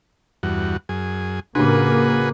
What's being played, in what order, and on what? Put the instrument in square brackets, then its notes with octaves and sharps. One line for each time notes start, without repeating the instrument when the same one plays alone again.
[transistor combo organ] E2 G2 F#4
F#2 G#4
[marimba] A2 D4 [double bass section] C#3 A#3 [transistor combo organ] F#4 G#4 B4